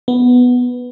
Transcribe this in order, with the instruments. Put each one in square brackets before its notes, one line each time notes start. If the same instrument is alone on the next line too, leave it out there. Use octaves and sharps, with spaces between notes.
[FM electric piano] B3